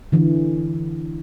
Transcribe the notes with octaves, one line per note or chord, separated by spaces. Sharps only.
D3 E3